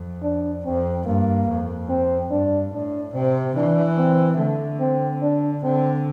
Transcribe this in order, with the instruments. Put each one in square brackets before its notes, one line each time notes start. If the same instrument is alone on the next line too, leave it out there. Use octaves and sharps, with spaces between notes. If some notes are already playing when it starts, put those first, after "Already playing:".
Already playing: [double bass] F2
[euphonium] D4
[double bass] F2 [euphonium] C4
[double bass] G2 [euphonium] A#3
[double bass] F2
[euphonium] C4
[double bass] G2 [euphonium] D4
[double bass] A2 [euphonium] D4
[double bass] C3 [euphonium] C4
[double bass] E3 [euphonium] D4
[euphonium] C4
[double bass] D3 [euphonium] A3
[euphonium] C4
D4
[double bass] D3 [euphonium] C4